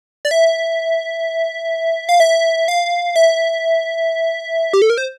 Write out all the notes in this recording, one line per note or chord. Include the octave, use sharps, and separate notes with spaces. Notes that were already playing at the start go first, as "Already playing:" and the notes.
D5
E5
F5
E5
F5
E5
G4
A4
A#4
C5